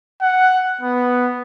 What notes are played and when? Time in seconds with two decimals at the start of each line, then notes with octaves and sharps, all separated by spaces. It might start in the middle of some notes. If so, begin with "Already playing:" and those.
0.22 F#5
0.81 B3